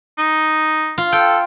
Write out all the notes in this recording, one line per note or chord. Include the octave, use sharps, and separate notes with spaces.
D#4
F4
A4 G5